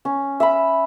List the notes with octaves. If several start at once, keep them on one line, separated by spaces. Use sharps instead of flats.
C#4
E5 B5